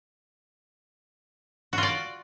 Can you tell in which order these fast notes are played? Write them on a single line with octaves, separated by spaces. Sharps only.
F#4 F4 D5